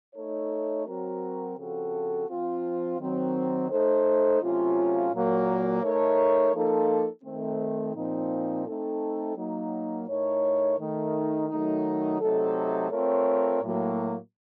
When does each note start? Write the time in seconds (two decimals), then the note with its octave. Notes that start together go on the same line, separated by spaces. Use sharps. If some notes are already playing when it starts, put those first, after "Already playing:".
0.15 A3 D#4 A4 C#5
0.86 F#3 C4 F#4 A#4
1.56 C#3 F3 C4 F#4 A4
2.29 F3 C4 F4
2.98 D#3 F#3 C4
3.70 A3 D#4 A4 C5
4.41 C3 F#3 A3 C#4 F4
5.11 A#2 F#3 A#3
5.83 A3 D#4 A#4 C#5
6.54 F3 A#3 D#4 A4
7.24 D#3 A3 C4
7.95 A#2 F3 C4 D#4
8.66 A3 C4 D#4 A4
9.36 F#3 A#3 D#4
10.08 A2 A3 D#4 A#4 C#5
10.79 D#3 A3 D#4
11.49 D#3 F#3 A3 D#4
12.21 C3 F#3 A3 D#4 A4
12.91 A3 C4 F4 A#4 C#5
13.62 A2 F#3 A#3